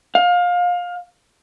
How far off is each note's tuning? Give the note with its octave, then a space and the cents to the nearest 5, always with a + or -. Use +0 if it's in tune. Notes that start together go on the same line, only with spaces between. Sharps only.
F5 +25